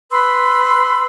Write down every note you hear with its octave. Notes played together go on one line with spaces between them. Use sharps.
B4 B5 C6 E6